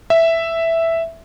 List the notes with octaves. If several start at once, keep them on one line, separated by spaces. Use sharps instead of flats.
E5